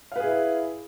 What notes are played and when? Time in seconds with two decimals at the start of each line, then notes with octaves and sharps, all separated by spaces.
0.12 F5
0.16 B4
0.20 G#4
0.24 E4